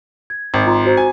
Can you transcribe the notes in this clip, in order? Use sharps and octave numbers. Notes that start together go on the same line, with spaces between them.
G#6
G#1
F4 A#5 C6
F#4 C5 A#5
G#5